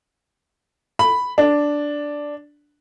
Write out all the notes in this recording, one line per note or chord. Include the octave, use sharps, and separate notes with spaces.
B5
D4